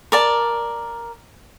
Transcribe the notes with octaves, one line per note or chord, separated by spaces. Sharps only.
A#4 D5 A5